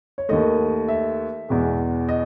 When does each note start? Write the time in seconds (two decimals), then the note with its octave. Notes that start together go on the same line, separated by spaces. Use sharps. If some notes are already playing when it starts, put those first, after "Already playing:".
0.18 C#5
0.29 D#2 D#3 A3 D#5
0.88 E5
1.49 E2 B2 G#3
2.09 D#5